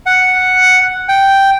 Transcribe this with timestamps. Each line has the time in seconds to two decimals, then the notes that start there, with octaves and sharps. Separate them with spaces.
0.06 F#5
1.09 G5